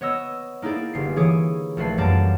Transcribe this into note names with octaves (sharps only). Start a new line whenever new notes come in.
B3 C#5 D#5 E6
A#3 D#4 E4 G#4 D5
G1 C7
E3 G#4 C#5 D6 D#6
A#1 A3 B4 C7
F#2 G3 A#3 D5 A5